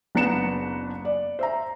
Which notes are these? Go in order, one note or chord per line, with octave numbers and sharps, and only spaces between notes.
F#1 B3 D4 A#5 C#7 E7
D5
C5 E5 A#5